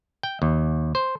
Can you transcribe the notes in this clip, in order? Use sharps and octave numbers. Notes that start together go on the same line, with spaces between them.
G5
D#2
C5